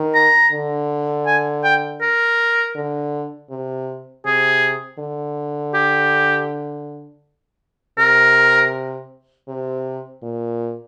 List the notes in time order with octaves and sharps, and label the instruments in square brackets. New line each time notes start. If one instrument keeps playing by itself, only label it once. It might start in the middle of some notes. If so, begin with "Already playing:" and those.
Already playing: [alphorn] D#3
[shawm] A#5
[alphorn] D3
[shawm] G#5
G5
A#4
[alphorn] D3
C3
[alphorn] C3 [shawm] G#4
[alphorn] D3
[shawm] G4
[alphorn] C3 [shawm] A#4
[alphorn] C3
A#2